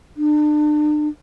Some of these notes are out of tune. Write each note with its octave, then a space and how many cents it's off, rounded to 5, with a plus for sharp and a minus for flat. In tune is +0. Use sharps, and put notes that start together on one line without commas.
D4 +40